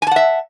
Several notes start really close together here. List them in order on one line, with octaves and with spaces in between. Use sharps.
G#5 A5 F#5 E5